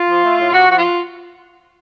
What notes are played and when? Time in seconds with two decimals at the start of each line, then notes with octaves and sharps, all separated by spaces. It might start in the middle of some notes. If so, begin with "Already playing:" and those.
Already playing: F4
0.09 F3
0.24 A3
0.39 A2
0.53 C3 F#4
0.68 F3 F#4
0.77 F4